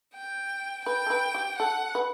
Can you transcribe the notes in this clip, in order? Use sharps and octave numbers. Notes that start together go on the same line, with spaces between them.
G5
B4 G5
A4
B4
G4
A4 F#5
B4